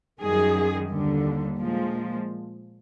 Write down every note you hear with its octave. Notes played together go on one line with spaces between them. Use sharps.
F#2 D#3 G3 G#4
D#2 D3 G3
A#2 F3 G#3